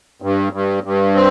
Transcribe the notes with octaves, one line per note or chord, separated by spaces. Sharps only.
G2
G2
G2
C4